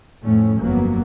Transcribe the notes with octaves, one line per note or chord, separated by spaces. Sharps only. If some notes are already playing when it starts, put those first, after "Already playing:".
F2 A2 A3 C#4
G1 F2 F#3 A#3 B3